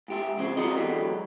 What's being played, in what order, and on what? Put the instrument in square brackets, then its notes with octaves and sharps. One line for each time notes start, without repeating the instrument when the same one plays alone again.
[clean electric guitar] G#2 G4 E5
C#3 F3 C4 G#4 C5
F#3 C4 D4 F#4 A#4 D#5
D3 E3 F#3 G#3 B3 G4